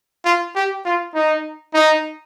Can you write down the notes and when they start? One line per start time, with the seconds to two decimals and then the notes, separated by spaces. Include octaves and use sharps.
0.25 F4
0.55 G4
0.85 F4
1.15 D#4
1.74 D#4